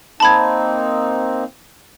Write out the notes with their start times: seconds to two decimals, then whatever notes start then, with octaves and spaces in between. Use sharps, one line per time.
0.20 A#3 C4 D#4 A5 B5 G#6